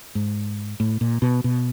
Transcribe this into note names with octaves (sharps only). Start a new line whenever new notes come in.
G#2
A2
A#2
B2
B2